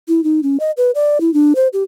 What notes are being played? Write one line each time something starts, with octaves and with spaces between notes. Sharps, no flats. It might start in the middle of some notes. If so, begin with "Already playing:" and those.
E4
D#4
C#4
D#5
B4
D5
E4
D4
C5
G4